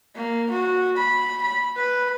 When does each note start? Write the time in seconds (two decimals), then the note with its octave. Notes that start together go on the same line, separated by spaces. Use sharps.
0.15 A#3
0.50 F#4
0.97 B5
1.42 B5
1.77 B4